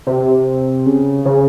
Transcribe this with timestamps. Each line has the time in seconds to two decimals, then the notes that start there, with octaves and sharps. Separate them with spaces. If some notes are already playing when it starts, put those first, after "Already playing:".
0.07 C3
0.86 C#3
1.25 C#3